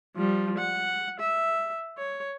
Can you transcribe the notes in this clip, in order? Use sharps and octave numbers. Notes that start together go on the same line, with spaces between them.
F3 G3
F#5
E5
C#5